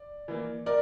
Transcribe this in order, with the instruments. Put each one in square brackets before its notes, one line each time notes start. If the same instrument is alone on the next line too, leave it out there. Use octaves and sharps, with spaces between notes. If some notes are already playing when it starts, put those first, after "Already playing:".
Already playing: [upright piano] D5
E3 A#3
A#4 D5